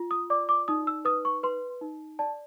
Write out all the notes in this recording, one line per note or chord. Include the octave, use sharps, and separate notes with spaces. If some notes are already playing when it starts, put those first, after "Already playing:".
Already playing: F4
D#6
D5 D6
D6
D#4 D#6
E6
B4 D#6
C#6
B4 C6
D#4
D5 A5